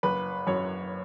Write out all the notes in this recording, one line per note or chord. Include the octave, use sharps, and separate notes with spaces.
F#1 B4
F#2 C#5